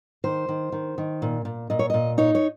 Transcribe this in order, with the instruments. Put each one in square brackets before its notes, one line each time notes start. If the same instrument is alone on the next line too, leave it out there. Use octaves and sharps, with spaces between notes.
[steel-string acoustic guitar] D#3 C5
D#3
D#3
D#3
A#2
A#2
A#2 D#5
C#5
A#2 D#5
D#4 C#5
C#5